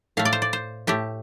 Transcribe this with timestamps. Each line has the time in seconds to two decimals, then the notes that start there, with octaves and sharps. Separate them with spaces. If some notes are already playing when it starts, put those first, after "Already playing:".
0.17 A2 A3 F5
0.25 D5
0.33 C5
0.42 D5
0.53 C5
0.87 A2 A3 G4